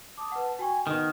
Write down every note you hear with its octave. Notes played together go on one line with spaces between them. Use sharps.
A5 D6 D#6
B4 F#5
F#4 G5 G#5 C#6
D#3 B3